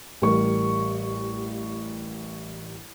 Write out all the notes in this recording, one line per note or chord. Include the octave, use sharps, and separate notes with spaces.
A1 G3 A#4 C#6